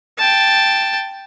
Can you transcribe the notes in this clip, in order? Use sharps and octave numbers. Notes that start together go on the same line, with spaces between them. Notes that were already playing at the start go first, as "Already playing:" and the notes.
G5 A5